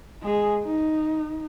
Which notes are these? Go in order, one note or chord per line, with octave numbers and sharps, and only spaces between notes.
G#3 G#4
D#4